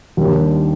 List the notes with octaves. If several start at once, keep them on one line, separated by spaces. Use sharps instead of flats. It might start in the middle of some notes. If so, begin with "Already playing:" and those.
D#2 D#3 G3 D4